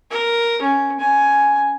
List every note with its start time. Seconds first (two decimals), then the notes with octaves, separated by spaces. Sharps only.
0.11 A#4
0.62 C#4
0.99 C#4 G#5